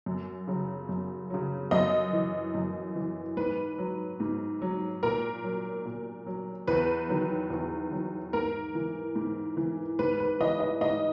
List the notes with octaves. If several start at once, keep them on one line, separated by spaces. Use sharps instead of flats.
F#2
C#3 F#3
F#2
C#3 F#3
F#2 D#5
E3
F#2
E3
G#2 B4
F#3
G#2
F#3
A#2 A#4
F#3
A#2
F#3
E2 B4
D#3 F#3
E2
D#3 F#3
G#2 A#4
E3
G#2
E3
G#2 B4
B4
E3 D#5
D#5
G#2 D#5